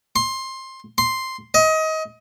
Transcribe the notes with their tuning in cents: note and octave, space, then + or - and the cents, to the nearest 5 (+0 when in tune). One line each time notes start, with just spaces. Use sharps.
C6 +15
C6 +0
D#5 +25